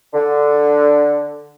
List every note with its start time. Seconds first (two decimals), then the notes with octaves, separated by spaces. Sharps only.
0.14 D3